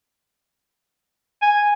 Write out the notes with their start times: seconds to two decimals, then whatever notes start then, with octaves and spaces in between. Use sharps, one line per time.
1.42 G#5